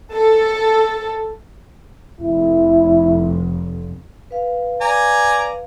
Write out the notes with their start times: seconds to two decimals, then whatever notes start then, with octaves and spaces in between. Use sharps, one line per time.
0.14 A4
2.21 F1 E4
4.31 B4 F5
4.81 D5 G#5 A#5